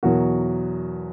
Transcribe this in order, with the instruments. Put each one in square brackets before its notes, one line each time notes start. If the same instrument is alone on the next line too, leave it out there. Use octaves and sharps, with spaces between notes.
[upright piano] E2 B2 F#3 F#4 A#4